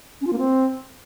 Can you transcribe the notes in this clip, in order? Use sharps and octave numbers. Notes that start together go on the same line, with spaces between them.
C#4
F4
A#3
C4